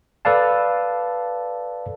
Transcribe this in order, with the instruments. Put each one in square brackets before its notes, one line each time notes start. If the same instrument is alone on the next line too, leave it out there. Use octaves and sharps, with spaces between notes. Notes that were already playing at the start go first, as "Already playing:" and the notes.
[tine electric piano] A4 B4 D5 F5 A5